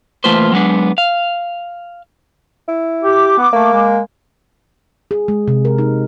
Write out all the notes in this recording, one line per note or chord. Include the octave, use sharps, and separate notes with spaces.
E3 A3 A#3 F4 B4 C5
F#3 G#3 B3 D4
F5
E4
G4 D6
B3
A3 A#3
G#3
G#4
G#3
C3
A#4
D#4